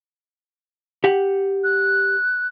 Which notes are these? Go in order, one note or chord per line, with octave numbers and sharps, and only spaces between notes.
G4 F#5
F#6